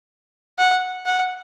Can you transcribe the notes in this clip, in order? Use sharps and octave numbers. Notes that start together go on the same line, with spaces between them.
F#5
F#5